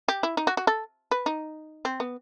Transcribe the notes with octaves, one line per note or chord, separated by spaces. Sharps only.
G4
E4
D#4
F#4
F#4
A4
B4
D#4
C4
B3